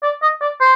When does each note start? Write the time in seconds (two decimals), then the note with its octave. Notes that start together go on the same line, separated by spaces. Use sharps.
0.03 D5
0.22 D#5
0.42 D5
0.60 C5